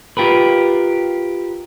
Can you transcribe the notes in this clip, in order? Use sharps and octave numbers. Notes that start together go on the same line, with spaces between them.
F4 G4 A#4 B4